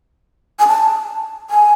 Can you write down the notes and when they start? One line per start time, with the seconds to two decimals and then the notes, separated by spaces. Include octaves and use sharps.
0.59 G#5
0.68 A5
1.50 G#5